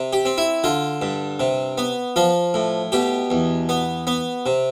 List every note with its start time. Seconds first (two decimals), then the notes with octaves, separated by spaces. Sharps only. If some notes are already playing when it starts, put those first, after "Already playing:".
Already playing: C3
0.13 G4
0.25 C4
0.38 E4
0.64 D3 F4
1.02 G2
1.40 C3
1.78 B3
2.16 F3 F4
2.54 A2
2.92 B2 G4
3.30 E2
3.69 B3
4.07 B3
4.46 C3